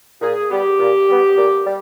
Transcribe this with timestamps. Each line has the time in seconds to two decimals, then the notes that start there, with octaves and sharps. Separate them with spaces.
0.21 A#2 G#4
0.50 G3 B3 G4
0.79 A#2
1.09 G3 B3
1.37 A#2
1.65 G3